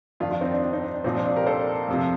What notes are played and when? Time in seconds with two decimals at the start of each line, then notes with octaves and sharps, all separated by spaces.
0.20 F2 D#3 D4 F4
0.31 D4 F4
0.41 C4 D#4
0.51 D4
0.62 D4
0.73 C4 D#4
0.83 D4
0.94 D4
1.04 C2 A#2 F3 C4 D#4
1.15 D4
1.25 D4
1.36 G4 A#4
1.46 A4 C5
1.88 F2 C3 F3